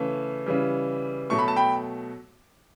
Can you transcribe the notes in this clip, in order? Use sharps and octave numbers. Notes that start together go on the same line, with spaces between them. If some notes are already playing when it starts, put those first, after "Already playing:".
Already playing: C#3 E3 A3
C#3 E3 G3
B2 F#3 A3 C#6
B5
A5
G5 B5